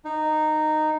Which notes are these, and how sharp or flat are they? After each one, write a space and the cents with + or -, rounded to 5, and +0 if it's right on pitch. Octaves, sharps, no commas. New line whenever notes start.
D#4 -10